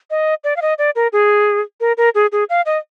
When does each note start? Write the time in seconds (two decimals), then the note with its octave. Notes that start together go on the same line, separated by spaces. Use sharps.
0.10 D#5
0.44 D5
0.56 F5
0.62 D#5
0.78 D5
0.96 A#4
1.13 G#4
1.81 A#4
1.98 A#4
2.15 G#4
2.32 G#4
2.50 F5
2.66 D#5